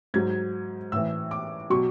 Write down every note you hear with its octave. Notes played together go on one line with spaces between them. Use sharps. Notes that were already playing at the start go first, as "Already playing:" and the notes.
G#2 F#3 G#6
A2 E3 E6
D6
B2 F#3 C#6